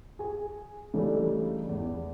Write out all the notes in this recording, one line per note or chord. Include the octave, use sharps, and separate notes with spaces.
G#4 G#5
C#3 E3 G3 A3 D4 D#4
E2